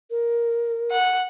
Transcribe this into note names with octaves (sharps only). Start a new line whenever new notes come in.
A#4
F#5